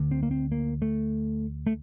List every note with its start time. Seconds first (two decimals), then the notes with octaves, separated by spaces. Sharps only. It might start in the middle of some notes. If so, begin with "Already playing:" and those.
Already playing: D2 D3
0.11 C4
0.23 A#3
0.31 C4
0.52 A#3
0.82 A3
1.67 A3